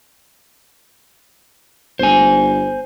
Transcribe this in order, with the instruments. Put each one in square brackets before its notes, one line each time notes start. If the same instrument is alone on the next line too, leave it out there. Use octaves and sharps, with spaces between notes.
[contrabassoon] G1 [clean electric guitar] C5 G#5